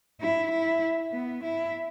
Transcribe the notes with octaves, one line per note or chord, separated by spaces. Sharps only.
E4
E4
B3
E4